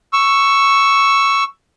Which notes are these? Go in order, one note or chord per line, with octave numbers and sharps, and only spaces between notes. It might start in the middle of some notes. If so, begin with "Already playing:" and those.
C#6 E6